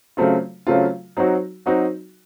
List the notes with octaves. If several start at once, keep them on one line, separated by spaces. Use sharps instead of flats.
C#3 F#3 A3 C4 F4
C#3 F#3 A3 C4 F4
F#3 C4 D#4 F#4
F#3 C4 D#4 F#4